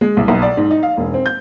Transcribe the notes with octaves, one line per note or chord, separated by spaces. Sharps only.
G#3
C2
B1
D5
G#2
D#4
F5
E1
C4
G6